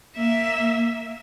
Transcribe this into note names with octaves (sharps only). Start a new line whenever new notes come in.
A#3 E5